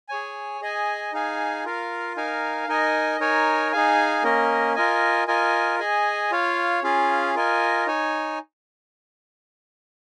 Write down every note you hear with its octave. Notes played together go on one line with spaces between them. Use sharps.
G#4 C#5 G#5
G#4 D#5 G#5
D#4 G#4 F5 G#5
F4 A#4 F5
D#4 A#4 F5 G#5
D#4 A#4 D#5 G#5
D#4 A#4 C#5 G#5
D#4 G#4 F5 G#5
A#3 C#4 A#4 D#5
F4 A#4 D#5 G#5
F4 A#4 D#5 G#5
G#4 D#5 G#5
F4 C#5 F5
C#4 F4 G#4 F5
F4 A#4 D#5 G#5
D#4 C#5 G#5